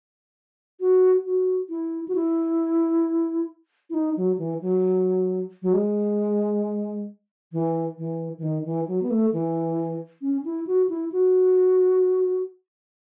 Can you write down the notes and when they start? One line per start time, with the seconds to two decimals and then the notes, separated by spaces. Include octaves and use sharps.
0.80 F#4
1.25 F#4
1.69 E4
2.08 F#4
2.15 E4
3.90 E4
3.94 D#4
4.17 F#3
4.39 E3
4.61 F#3
5.62 F#3
5.74 G#3
7.53 E3
7.98 E3
8.38 E3
8.43 D#3
8.65 E3
8.88 F#3
9.02 B3
9.10 A3
9.33 E3
10.22 C#4
10.45 E4
10.67 F#4
10.89 E4
11.12 F#4